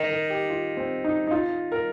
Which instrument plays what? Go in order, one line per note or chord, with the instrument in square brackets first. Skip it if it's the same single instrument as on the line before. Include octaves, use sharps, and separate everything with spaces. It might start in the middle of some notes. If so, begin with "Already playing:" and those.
Already playing: [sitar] D#3 [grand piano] A#4
[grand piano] A#4
G4
F4
C4
D#4
D#4
F4
A#4